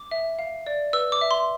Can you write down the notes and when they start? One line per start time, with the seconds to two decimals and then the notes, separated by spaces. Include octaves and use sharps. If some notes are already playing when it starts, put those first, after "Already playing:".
Already playing: D6
0.11 E5
0.39 F5
0.67 D5
0.93 B4 E6
1.12 D6
1.21 E5
1.31 C6